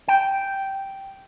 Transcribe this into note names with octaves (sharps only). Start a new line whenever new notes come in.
G5